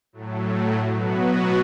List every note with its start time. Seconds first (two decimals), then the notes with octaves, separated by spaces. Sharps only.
0.13 A2 F#3 A3
0.92 B2 F#3 B3 F#4 B4